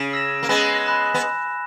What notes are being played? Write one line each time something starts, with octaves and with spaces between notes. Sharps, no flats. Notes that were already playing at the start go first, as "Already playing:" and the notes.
Already playing: C#3
E6 A#6 E7
A#3
G#3 B3 G#5 B5 F#6 A#6 E7
G#5 B5 F#6 A#6 E7
B3